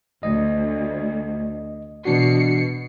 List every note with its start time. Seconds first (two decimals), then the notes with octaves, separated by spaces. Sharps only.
0.23 D2 D#5
2.05 B2 E3 D4 F#4 C7 C#7